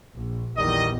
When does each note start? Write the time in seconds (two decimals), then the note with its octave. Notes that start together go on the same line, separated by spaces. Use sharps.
0.16 A#1
0.57 A#1 E2 D#3 G3 D#5